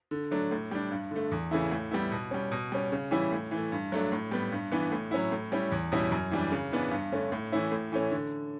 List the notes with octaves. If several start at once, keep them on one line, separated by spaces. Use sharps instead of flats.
D3
F#3 A3 D4
A2
G3 D4
G2
D3 A3
E2
C#3 E3 A3 E4
A2
G3 B3 E4
B2
G3 C#4
B2
G3 C#4
C#3
E3 G3 C#4 E4
A2
E3 A3
G2
F#3 A3 D4
A2
G3 B3
G2
E3 B3 D4
A2
F#3 C#4 E4
A2
G3 C#4 E4
E2
B2 G3 C#4 E4
F#2
E3 G3 D4
C#3
E3 B3 D4
G2
D3 A3 C#4
A2
E3 A3 C#4 E4
A2
E3 A3 C#4
D3